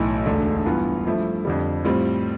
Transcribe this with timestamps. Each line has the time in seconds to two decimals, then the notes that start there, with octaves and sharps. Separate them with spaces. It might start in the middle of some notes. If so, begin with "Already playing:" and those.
Already playing: B1 A2 E3
0.26 E1 D2 D3 A3
0.66 G2 E3 B3 F4
1.06 G2 F3 A3 E4
1.45 F2 D3 G3
1.85 A2 G3 C4 F4